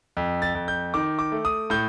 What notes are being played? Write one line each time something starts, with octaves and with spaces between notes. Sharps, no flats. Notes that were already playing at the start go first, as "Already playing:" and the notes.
F2
A6
F2
G6
D#3 D6
D6
A3
D#6
A2 G6